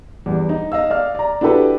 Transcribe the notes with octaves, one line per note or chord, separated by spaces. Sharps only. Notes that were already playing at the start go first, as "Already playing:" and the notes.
E2 G2
D#4
D#5 F5 E6
D5 F5 F6
D5 A#5
D4 E4 F#4 G4 A4 B4